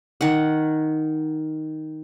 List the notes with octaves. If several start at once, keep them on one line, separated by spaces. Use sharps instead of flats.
D#3 F#5